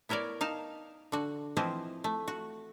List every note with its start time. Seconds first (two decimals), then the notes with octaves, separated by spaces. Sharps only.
0.09 B3 E4 A#4 C#5 D5
0.41 D#4 F5 A5
1.12 D3 F#4
1.57 E3 F3 C4 E4 C5 D#5
2.04 A3
2.28 F#4